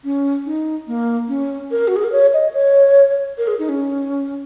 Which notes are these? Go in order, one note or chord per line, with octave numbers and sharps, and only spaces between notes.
C#4
D#4
A#3
C#4
A#4
F#4
G#4
A#4
C#5
D#5
C#5
A#4
G#4
D#4
C#4